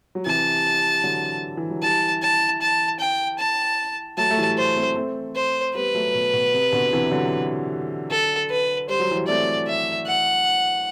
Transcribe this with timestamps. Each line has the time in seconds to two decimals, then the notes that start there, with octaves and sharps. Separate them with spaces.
0.15 F#3
0.26 C3 E3 A5
1.04 D3 F#3
1.57 E3
1.70 F#3
1.82 E3 G3 A5
2.22 A5
2.62 A5
3.00 G5
3.39 A5
4.17 F#3 A3 A5
4.31 A3
4.38 E3 G3
4.58 C5
4.77 A3 C4
4.96 A3 C4
5.36 C5
5.75 G3 B3 B4
5.95 F#3 A3
6.15 B2
6.33 B2
6.54 C3
6.72 B2 D3
6.92 C3 E3
7.12 D3 F#3
8.11 A4
8.50 B4
8.88 G3 C5
9.00 F#3
9.11 E3 G3
9.28 A3 C4 D5
9.67 E5
10.07 F#5